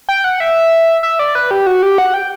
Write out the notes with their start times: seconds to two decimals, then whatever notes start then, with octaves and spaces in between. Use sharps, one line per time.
0.09 G5
0.24 F#5
0.40 E5
1.03 E5
1.19 D5
1.35 B4
1.51 G4
1.67 F#4
1.83 G4
1.98 F#5
2.14 G5